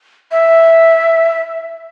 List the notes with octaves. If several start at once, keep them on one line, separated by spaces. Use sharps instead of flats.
E5